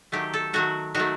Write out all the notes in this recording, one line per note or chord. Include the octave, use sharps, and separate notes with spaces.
D#3 F#3 A3 G4
A4
D#3 F#3 A3 F#4
D#3 F#3 A3 F#4